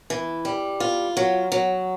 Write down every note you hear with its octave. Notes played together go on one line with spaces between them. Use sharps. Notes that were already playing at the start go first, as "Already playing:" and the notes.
E3
G3
F4
F#3
F#3